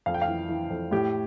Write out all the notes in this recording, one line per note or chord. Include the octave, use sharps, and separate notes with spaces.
F2 F5
G5
F5
E3
E3
F2
A2 G4